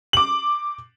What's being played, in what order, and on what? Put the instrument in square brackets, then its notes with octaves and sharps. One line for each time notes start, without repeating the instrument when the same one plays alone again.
[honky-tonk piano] D6 F#7